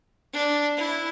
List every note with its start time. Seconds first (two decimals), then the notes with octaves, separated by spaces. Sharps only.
0.33 D4
0.77 E4